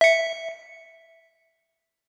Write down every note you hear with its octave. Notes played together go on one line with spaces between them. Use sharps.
E5 C#7